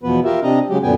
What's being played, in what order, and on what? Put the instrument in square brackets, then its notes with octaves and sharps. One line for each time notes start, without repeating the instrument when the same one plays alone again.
[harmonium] E2 B2 F3 B3 B4
F4 G4 A#4 E5
C3 C4 D4 D#5 A#5
C#3 F#3 G#3 G4
F#2 A#2 D3 B3 G5 G#5